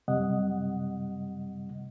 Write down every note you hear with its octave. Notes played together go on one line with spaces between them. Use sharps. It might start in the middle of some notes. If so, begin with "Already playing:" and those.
F#2 C3 G3 D#5 F#5